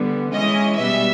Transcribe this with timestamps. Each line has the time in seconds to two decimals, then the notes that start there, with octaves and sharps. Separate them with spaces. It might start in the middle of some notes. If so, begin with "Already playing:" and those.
Already playing: D3 G3 B3
0.33 E3 G#3 C#4 D#5
0.78 B2 G3 B3 E5